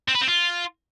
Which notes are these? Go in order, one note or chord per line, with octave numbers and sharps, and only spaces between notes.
C4
B4
C4
F4